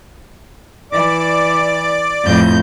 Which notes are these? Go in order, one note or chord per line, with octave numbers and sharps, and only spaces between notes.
E3 D5 D6
F2 A2 G6